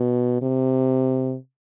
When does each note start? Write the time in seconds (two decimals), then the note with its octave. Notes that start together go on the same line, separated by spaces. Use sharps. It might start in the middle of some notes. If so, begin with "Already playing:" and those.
Already playing: B2
0.41 C3